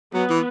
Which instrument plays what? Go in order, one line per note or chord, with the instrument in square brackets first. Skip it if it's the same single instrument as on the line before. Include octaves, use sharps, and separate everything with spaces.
[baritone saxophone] F#3 [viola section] B3
[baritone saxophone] E3